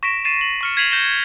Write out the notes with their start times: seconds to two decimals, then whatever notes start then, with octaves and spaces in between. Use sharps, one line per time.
0.03 C#6 A#6 B6 D7 E7
0.25 A6 C7 D#7 E7
0.41 F#7
0.61 C#6 F6 C#7
0.77 G#6 B6 C7 D#7 F7 F#7
0.91 G6 A#6 E7 G7